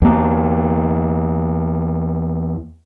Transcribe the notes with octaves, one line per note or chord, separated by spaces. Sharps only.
E2 A#3